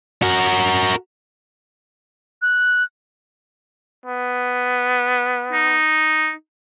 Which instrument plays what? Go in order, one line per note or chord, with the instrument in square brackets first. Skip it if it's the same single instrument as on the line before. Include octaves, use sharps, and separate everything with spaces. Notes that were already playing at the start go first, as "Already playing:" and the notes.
[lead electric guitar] F#4 A#4
[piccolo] F#6
[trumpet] B3
[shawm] D#4